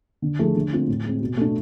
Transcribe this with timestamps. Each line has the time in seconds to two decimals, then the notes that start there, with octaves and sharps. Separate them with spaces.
0.22 D3
0.39 F3 A3 E4 G#4
0.55 D3
0.72 A3 C4 F4
0.88 A2
1.05 G#3 C4
1.21 B2
1.37 A3 D4